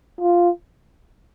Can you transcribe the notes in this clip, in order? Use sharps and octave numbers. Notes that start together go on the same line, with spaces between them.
F4